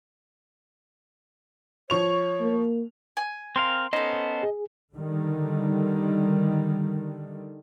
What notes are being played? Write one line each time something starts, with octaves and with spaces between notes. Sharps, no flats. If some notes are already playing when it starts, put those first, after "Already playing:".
F3 C#5 C#6 F7
A#3
G#5
C4 A#4 F5 C6
B3 C#4 D#4 A4 C5 D#5
G#4
D3 D#3 G3